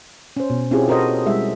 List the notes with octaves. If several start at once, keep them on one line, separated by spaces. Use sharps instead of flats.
C#4 C5
B2
C4 C#4 E4 F4 G4 G#4
F#4 A4 A#4 C5 C#5 D#5
G3 G#3 E4 E5